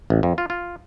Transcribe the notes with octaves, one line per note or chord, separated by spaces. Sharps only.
A1
F2
F4
F4